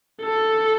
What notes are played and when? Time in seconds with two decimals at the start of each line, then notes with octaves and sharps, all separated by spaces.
0.22 A4